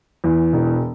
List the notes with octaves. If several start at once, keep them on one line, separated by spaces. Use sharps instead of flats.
E2
E1